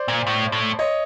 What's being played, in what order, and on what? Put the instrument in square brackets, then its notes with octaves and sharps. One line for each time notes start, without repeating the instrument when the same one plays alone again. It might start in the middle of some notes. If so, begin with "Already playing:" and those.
Already playing: [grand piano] C5 D5
[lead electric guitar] A#2
A2
A2
[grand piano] C#5 D#5